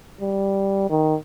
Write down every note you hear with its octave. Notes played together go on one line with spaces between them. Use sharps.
G3
D#3